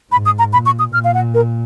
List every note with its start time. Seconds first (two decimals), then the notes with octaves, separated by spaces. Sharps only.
0.11 G#2 B5
0.26 D#6
0.39 A#5
0.52 A#2 B5
0.66 C#6
0.79 D#6
0.93 A#2 F6
1.04 F5
1.14 F#5
1.34 A#4